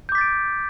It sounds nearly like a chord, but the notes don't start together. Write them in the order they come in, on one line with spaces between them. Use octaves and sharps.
G6 D6 B6 A6 D7